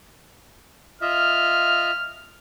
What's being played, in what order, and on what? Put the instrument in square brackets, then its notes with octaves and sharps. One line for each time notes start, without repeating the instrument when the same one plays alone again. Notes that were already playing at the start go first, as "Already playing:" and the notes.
[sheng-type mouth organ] F4 D#5 E5 [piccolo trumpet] F6